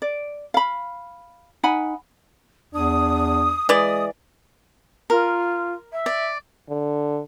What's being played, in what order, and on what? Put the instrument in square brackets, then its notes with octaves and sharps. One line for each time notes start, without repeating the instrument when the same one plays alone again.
[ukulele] D5
F5 B5
D#4 F#5 G#5 B5
[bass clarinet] E2 [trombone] D4 [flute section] D#6
[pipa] E3 D5 [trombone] G#3 [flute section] D#6
[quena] F4 [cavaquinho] A#4
[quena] E5
[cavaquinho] D5
[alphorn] D3